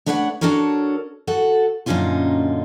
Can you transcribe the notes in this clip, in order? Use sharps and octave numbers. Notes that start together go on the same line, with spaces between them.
A3 D4 B4 C#5 F5 F#5
D4 F4 F#4 A4 A#4 C#5
F#4 A4 F#5
F#2 A#2 D3 C#4 D#4 F4